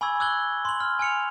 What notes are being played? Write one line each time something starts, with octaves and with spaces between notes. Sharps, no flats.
G#5 B5 C#6 D6 E6 G#6
D6 E6 F#6 G#6 F#7 G7
C6 F#7
F6
G#5 F6 C#7 F7